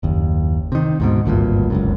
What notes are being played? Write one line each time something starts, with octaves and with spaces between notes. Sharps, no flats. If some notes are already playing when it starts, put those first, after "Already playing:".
F#1 D#2
C3 D#3
D2 G#2 B2
G#1 D2 G2 A#2
F1 C#2 F#2